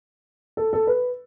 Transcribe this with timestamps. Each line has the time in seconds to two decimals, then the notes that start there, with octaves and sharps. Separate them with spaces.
0.57 A4
0.73 A4
0.87 B4